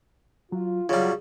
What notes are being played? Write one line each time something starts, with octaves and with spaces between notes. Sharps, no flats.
F#3 F4
C#3 F#3 G3 F4 C#5 F5